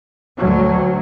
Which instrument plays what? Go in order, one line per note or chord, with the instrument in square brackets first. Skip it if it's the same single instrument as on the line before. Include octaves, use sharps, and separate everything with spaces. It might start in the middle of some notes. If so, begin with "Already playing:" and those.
[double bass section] D2 F#3